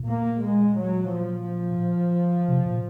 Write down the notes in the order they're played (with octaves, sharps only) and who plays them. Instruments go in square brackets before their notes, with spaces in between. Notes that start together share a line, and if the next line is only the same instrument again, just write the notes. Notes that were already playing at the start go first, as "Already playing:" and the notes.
Already playing: [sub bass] A#2
[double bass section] A#3
G#3
F#3
F3
[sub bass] C3
A#2